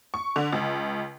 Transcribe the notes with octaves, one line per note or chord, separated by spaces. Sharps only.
C#6
D3
C#2